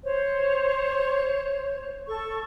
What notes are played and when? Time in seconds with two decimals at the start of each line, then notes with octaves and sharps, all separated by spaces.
0.04 C5 C#5
2.07 A4 C#6